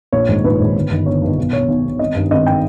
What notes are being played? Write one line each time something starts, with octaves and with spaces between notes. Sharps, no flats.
A#1 C#5
G#2 D#3
A#1 B4
G#2 D#3
G1
G2 D#3
G1 C#5
G2 D#3
B1
B2 C#5
B1
B2
G#1 D#5
G2 D#3
G#1 D#5
D#3 G5